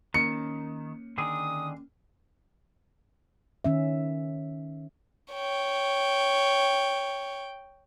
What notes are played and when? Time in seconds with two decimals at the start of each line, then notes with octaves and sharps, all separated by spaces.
0.14 D#3 A#3 C#4 C#7
1.18 D3 D#3 G#4 D#6
3.64 D#3 C#4 E5
5.34 C#5 G5